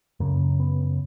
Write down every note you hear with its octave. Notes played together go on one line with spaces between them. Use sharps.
F#2 C#3 A#3
B3